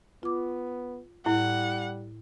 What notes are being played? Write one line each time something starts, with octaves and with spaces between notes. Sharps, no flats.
B3 F4 D6
A2 G3 E4 F#5